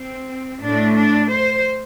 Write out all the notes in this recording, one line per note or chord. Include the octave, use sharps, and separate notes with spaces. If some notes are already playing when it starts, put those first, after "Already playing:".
Already playing: C4
A2 A3 D4
D4
C5